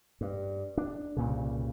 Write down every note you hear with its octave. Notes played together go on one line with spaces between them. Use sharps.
G2
D4
C2 G2 A#2 C#3